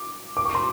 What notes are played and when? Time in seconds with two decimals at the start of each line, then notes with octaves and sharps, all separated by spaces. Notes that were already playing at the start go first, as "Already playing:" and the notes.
Already playing: D6
0.37 D6
0.46 C#6
0.55 C6